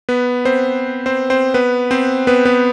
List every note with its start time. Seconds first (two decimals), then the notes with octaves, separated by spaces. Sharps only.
0.09 B3 B4
0.45 C4 C5
1.06 C4 C5
1.30 C4 C5
1.54 B3 B4
1.91 C4 C5
2.27 B3 B4
2.45 B3 B4